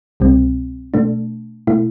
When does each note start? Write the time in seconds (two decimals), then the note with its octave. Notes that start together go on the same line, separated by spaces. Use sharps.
0.20 C2 B2 G3 C4
0.94 B2 A3 D4
1.67 B2 A3 E4